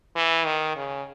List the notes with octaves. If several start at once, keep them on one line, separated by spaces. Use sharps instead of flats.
E3
D#3
C#3